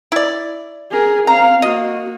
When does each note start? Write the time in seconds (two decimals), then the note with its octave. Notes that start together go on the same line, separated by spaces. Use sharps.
0.12 E4 D5
0.91 G#4 A#4
1.27 C4 F5 A#5
1.62 A#3 F#4 D#5